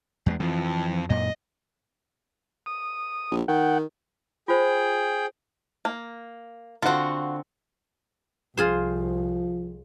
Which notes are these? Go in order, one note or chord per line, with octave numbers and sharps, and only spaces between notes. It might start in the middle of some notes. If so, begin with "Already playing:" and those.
E2 F#3 G#3
F2 E3 F3
F#2 A#2 D#5
D#6
A#1
D#3 F#5 G5
F4 G#4 C5 G5
A#3
D3 C4 F4 F#4
C2 F3 F4 G#4 C5